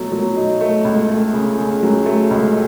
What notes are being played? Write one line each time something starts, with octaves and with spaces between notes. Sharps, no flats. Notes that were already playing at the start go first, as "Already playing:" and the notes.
Already playing: B2 F#3 A3
F#3
D#4
A3
C#2
A3
C#3
C#3
F#3
A3
C#2